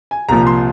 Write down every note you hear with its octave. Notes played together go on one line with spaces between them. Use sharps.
G#5
C2 A#2 F3 A#5
C6